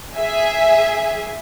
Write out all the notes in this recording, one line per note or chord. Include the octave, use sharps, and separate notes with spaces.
G#4 E5 G#5